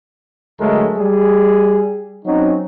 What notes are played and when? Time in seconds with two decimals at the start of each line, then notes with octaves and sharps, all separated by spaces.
0.60 D2 F#3 G#3 A3 A#4
0.98 G3 G#4
2.25 F#3 C4 C#4 D#4